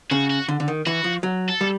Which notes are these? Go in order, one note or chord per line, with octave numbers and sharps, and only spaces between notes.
C#3 F#4
F#4
D3
D3
D#3
E3 F#4
F3
F#3
A4
G3